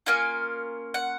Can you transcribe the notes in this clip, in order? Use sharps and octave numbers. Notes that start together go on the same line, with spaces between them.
A#3 C#4 F4 G#5
F#5